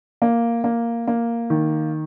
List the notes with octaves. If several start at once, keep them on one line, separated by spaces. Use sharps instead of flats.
A#3
A#3
A#3
D#3